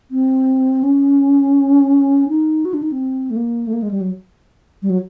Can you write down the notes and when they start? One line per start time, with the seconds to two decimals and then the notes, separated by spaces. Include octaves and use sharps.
0.11 C4
0.83 C#4
2.28 D#4
2.65 F#4
2.74 D4
2.82 D#4
2.92 C4
3.30 A3
3.36 A#3
3.67 A3
3.73 A#3
3.82 G#3
3.91 G3
4.01 F#3
4.82 G3
4.90 F#3